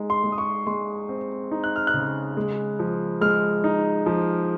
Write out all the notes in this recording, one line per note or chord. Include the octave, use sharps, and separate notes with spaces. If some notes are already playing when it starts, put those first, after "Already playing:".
Already playing: G#3 D#4
C6
G#3
D#6
C#6
G#3 C6
C4
D#4
F#6
F6
F#6
C#3
G#3
F3
G#3 F6
D#4
F3